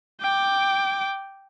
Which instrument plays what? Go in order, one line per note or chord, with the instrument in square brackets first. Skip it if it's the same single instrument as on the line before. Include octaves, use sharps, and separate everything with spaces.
[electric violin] G5 D6